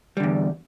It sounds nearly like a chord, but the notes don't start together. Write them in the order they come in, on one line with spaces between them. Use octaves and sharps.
G3 D3 E2